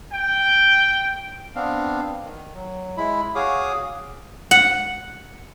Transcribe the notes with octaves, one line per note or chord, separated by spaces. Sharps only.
G5
B3 C4 D4 F5
D#3
F#3
G#3 E4 B5
F#4 G#4 C#5 F5 D6 D#6
F#5